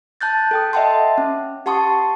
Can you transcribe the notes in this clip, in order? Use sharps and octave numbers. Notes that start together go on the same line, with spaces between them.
A5 F#6 G6 A6
A4 G5 D#6
D#5 E5 F#5 G5 A5 C6
C#4
G4 F#5 A5 C6 C#6 D#6